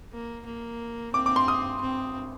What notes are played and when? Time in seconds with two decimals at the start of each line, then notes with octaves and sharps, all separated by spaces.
0.13 A#3
0.46 A#3
1.13 C4 D6
1.26 D6
1.36 C6
1.48 D#6
1.81 C4